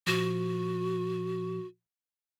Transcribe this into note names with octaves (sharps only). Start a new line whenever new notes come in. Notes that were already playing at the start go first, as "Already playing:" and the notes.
A#2 F3 F#4